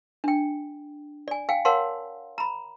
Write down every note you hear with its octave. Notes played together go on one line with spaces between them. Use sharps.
D4 G5
D5 G#5
F5 G5 G#5
A#4 C#5 F5 F#5 A5 C6
A#5 B5